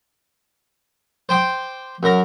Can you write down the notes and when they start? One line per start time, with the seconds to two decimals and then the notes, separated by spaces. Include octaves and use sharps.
1.29 C5 G5 C6 D6
2.03 F#2 A#4